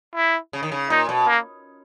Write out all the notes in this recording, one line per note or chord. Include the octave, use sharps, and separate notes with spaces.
E4
C#3
D#3
C#3
A#2 D#4
B2
A#3